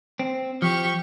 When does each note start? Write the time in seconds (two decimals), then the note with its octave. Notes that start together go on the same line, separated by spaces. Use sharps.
0.19 C4
0.62 F3 G4 C#6